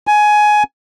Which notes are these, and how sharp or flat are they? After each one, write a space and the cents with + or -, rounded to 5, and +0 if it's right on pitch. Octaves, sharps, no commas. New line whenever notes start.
G#5 +15